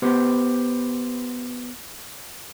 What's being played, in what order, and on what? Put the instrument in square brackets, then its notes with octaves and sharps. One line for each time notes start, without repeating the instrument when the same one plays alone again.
[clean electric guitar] B3 G4 B4 C5